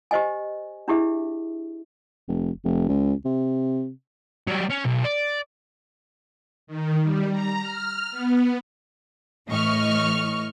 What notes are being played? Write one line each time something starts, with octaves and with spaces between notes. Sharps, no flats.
G4 C5 D#5 G#5
D4 E4 G4 G#4 E5
F1
F1
C#2
C3
F#3 G3
C#4
B1
D5
D#3
G3
A#5
F6
B3
A2 E3 D#5 C#6 F6